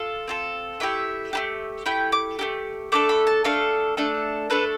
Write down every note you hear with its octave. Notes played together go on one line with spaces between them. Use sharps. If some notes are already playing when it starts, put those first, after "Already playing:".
Already playing: F4 A4
C4 F4 A4
A3 E4 G4 E5
A3 E4 G4
A3 E4 G4 G5
D6
A3 E4 G4
A3 D4 A4 D6
B5
A5
A3 D4 A4 F5
A3 D4 A4
A3 D4 A4 B4